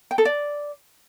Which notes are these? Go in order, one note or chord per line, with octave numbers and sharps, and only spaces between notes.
G5
A4
D5